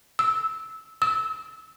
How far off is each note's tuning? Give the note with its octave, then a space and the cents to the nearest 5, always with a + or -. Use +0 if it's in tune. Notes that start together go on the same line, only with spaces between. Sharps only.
E6 -15
E6 -25